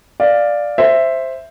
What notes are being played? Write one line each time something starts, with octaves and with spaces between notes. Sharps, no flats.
D5 F5
C5 E5